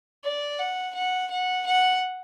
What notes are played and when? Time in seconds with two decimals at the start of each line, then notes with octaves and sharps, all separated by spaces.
0.24 D5
0.59 F#5
0.94 F#5
1.30 F#5
1.66 F#5